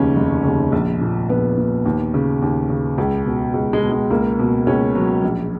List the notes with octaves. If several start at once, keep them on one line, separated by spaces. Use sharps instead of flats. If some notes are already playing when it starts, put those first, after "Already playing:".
Already playing: F1 D#2 C#3 C#4
F1
D#2 C#3
A#1
A#2
A#1 B3
A#2
D#2
C#3
D#2
C#3
C#2
B2
C#2
G#3
B2
G#3
C#2 A#3
B2
C#2 C#4
B2 F#3
A#1